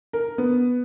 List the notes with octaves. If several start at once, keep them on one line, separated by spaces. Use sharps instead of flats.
A#4
B3